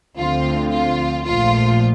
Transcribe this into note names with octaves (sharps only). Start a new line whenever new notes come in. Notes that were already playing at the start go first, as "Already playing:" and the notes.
D2 D3 F3 C4 F4
F4
A#1 A#2 F3 A3 F4